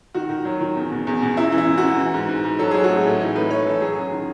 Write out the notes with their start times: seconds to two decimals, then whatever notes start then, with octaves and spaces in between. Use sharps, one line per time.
0.14 D#3 F#4
0.30 D#3
0.45 F#3
0.61 D#3
0.76 E2
0.91 B2
1.07 E2
1.22 B2
1.37 F#2 E4
1.52 E3
1.58 E4
1.67 F#2
1.78 F#4
1.83 F#2
1.98 E3
2.14 G#2
2.28 G#2
2.44 G#2
2.59 F#3 A4
2.71 F#3 G#4
2.84 F#4
2.90 A2
2.96 G#4
3.04 A2
3.20 E3 D#4
3.35 A2 B4
3.50 A2 C#5
3.66 E3 A4
3.81 F#3 G#4
3.96 F#2
4.12 D#3